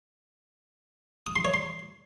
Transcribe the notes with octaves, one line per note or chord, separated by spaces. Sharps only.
D#6
C6
C#5
C6